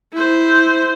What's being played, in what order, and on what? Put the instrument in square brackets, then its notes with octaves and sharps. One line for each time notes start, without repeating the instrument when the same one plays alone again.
[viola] E4 C5